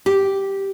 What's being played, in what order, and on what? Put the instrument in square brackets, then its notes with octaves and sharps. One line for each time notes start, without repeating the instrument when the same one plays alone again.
[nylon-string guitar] G4